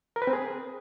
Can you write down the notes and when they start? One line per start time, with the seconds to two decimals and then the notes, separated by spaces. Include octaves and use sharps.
0.16 A#4
0.22 B4
0.27 C4
0.33 G#4